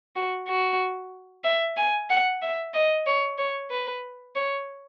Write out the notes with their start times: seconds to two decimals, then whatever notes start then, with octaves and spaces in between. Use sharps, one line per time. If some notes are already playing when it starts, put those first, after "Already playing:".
0.16 F#4
0.48 F#4
1.44 E5
1.77 G#5
2.10 F#5
2.42 E5
2.74 D#5
3.07 C#5
3.38 C#5
3.71 B4
4.35 C#5